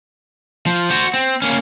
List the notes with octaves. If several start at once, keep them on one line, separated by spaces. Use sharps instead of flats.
F3
F#4 C5
C4
A#3 C#4